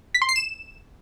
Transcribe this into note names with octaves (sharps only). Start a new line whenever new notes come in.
B6
C6
C7
E7